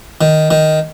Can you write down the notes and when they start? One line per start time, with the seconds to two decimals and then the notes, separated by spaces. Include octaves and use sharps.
0.21 D#3
0.51 D#3